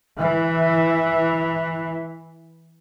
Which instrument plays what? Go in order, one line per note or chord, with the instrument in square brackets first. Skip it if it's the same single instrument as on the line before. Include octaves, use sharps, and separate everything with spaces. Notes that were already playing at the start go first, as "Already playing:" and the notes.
[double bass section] E3 [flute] E5